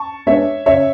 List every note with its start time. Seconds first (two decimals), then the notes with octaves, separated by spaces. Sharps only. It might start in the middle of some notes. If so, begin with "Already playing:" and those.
Already playing: A5 C#6
0.26 G#3 B3 D4 C#5 E5
0.66 C#3 C#5 E5